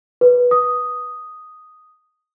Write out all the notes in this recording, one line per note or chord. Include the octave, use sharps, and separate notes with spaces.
B4
D#6